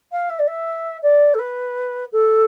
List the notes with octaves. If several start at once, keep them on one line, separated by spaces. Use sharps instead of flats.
F5
E5
D5
E5
D5
A4
B4
A4